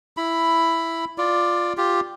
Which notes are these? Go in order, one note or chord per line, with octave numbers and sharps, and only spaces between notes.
E4 B5
F4 D5
F4 G4